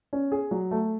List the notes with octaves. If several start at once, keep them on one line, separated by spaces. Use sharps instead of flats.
C#4
G#4
F#3
A3